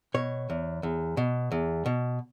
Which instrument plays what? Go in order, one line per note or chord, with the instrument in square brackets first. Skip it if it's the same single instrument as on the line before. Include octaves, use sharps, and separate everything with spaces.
[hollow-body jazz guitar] B2 C#5
E2
E2
B2
E2
B2